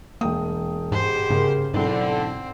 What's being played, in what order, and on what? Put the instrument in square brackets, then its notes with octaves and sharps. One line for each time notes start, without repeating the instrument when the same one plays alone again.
[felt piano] E1 G5 D#6 [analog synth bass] A#3
[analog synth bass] G#2 [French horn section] B2 G4 G#4 [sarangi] C5
[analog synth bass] G#2 [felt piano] C#3 A#4
[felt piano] B1 E4 [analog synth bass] G#2 [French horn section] D3 [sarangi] C4